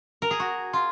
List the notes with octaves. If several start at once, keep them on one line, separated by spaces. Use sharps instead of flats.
A#4
G#4
F#4
F4